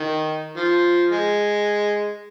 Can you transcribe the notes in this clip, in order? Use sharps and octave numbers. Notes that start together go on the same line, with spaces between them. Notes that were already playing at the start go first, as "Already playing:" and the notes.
Already playing: D#3
F3
G#3